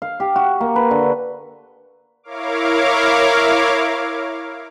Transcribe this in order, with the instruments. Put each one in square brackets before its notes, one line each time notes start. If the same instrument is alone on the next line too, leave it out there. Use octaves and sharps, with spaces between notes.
[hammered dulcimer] F5
G4
F#4
A#3
B4
D3
[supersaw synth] E4 A#4 C#5 F5 D6